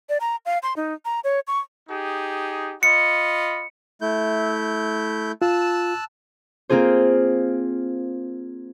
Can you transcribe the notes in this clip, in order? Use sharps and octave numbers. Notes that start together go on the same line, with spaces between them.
D5
A#5
F5
C6
D#4
A#5
C#5
C#6
D#4 G4 G#4
F4 D#5 B5 C#7
A3 E4 G6
F4 A5 E6 F#6
A#3 C4 F4 G#4 C5